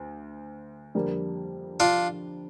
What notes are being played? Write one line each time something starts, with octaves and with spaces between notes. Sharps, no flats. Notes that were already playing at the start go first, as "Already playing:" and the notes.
Already playing: D2
F2 D3 G3 A#3
D4 F4